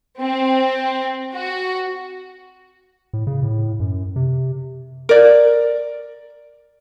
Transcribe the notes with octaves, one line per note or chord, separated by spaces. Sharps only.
C4
F#4
A2
C#3
A2
F#2
C3
A#4 D5